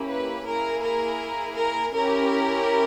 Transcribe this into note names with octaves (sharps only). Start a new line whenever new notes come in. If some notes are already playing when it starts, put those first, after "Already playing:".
Already playing: A#3 C#4 E4 G4
B4
A#3 E4 G#4 A#4
A#4
A#4
C#4 E4 G4 A#4